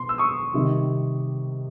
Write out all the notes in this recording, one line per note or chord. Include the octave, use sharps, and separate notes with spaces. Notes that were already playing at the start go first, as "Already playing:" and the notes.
Already playing: B2 C6
E6
C#6 D#6
C3 D#3 G3